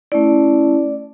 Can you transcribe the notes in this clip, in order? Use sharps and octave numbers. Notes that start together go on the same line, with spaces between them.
A3 C#4 E4 D5